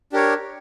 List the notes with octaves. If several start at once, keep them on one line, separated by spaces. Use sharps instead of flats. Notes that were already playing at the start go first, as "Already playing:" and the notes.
D4 G4 A#4 C#5